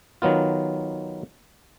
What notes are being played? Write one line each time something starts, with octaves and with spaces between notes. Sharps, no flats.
D#3 F#3 B3 F4